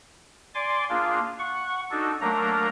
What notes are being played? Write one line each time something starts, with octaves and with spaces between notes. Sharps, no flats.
D5 G#5 C6 D6
A#3 D4 F4 G#4
F#5 C#6
D4 D#4 F#4 A4
F#3 A3 A#3 D4 A#4 A#5